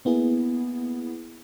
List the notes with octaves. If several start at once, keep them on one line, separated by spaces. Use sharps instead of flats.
A#3 B3 E4 G#4